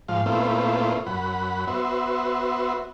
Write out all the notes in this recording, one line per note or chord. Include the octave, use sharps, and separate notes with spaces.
G#2 F3 F5
A#2 A3 B3 C4 E4 F4
F#2 F#5 B5
B3 F#4 C5 E5